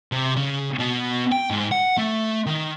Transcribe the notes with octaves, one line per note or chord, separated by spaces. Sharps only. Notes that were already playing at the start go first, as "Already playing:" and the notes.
C3
C#3
B2
G5
G#2
F#5
A3
D#3